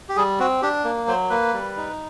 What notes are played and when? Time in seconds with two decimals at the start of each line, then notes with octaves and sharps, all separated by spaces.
0.09 G4
0.16 G3 G#4
0.40 C4 F#4
0.62 D4 G4
0.84 A#3
1.07 F#3 C5
1.30 A#3 B4
1.53 G3
1.77 D#4